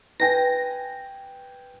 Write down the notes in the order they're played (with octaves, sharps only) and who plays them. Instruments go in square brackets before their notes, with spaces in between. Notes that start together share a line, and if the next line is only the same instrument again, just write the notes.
[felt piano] B4 G5 G#5 [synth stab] A#6